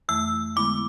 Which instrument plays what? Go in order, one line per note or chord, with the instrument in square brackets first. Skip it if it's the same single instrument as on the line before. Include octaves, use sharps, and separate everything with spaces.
[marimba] F2 E3 A3 E4 [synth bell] E6
[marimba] D3 G#3 B3 E4 [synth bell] D6